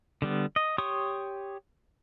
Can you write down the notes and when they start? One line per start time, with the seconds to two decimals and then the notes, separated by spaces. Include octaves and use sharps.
0.22 D3 G3 B3
0.56 D#5
0.78 G4 C#5 C6 C#6 D#6